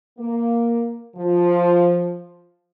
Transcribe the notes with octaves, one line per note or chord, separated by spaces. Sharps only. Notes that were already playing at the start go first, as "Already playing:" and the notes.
A#3
F3